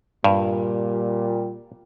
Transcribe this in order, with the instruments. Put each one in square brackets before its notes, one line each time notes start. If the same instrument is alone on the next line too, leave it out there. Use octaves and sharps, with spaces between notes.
[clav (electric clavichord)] G2 [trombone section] A#2 G3